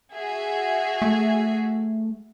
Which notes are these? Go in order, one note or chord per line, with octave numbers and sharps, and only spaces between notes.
F#4 G#4 E5
A3